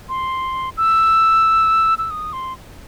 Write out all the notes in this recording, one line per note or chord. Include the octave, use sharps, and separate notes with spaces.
C6
E6
E6
D#6
C6